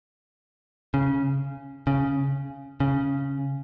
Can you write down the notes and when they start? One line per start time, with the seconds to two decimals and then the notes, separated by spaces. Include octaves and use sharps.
0.94 C#3
1.87 C#3
2.80 C#3